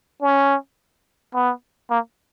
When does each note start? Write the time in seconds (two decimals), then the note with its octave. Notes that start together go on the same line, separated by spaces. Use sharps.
0.22 C#4
1.34 B3
1.90 A#3